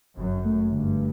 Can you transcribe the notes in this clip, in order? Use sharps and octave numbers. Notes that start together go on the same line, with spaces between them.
G1 F#2
A3
G2 D3